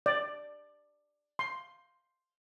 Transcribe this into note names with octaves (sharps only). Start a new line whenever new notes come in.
D5
C6